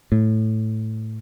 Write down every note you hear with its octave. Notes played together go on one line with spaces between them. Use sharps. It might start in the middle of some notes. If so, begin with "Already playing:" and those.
A2